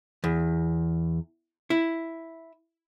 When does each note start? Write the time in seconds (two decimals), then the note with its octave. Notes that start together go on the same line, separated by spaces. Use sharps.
0.24 E2
1.70 E4